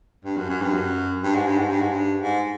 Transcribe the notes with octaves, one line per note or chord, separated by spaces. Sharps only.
G2
F#2
F#2
G2
F#2
G2
G#2
G2
G#2
G2
G#2
G2
G#2